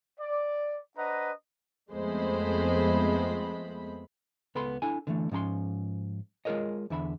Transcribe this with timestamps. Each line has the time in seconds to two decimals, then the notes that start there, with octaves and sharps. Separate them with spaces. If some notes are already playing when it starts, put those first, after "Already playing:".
0.19 D5
0.98 D4 B4 C5 D#5 F#5 A#5
1.90 F2 G#3 A3 B3 C5 B5
4.55 C#2 B3 A4 B5 C6
4.82 D4 E4 A4 G#5
5.07 D3 E3 A3
5.31 G#2 F3 C#4 A#5 C6
6.45 G#3 F4 G#4 A#4 C#5 D#5
6.90 E2 D3 E5 B5